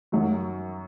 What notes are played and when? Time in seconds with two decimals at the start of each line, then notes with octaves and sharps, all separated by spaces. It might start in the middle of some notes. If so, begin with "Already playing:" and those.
0.12 F#2 D#3 F#3